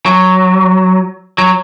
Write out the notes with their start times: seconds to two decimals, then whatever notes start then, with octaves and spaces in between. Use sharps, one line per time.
0.06 F#3
1.38 F#3